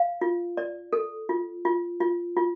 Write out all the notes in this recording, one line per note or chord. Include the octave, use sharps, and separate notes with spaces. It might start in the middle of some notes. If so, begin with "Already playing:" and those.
Already playing: F5
F4
D5
A4
F4
F4
F4
F4